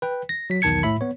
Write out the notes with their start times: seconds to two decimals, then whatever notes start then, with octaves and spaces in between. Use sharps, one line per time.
0.02 B4 G5
0.29 A#6
0.50 F#3 B6
0.62 B1 E2 D#3 A5 G#6 C#7
0.83 A2 E5 B5
1.01 B3 C#5